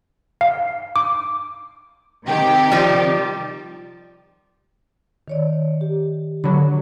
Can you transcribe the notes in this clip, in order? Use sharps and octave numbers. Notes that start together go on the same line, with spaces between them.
F5
D6
C3 D#3 G4
F3 G3
D#3 C#5 D5
G4
D3 F#3 B5